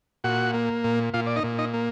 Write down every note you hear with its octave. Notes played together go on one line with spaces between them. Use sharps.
A#2 F#4 F#5
A#3
A#2
A#2 F4 F5
D5
D#4 D#5
A#2
D#4 D#5
A#3